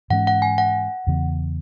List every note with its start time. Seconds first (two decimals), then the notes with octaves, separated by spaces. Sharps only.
0.10 G#2 E3 G#3 C#4 F#5
0.27 F#5
0.42 G#5
0.58 F#5
1.07 E2 C#3 E3 B3